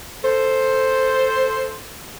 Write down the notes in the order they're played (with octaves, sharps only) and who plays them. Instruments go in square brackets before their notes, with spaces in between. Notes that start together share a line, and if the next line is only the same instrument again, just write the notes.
[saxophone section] A4 C5